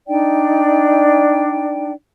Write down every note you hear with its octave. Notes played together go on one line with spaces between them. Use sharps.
D4 D#4 D5 G5